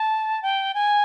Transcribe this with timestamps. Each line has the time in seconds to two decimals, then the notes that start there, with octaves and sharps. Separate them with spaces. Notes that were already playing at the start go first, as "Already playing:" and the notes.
Already playing: A5
0.42 G5
0.74 G#5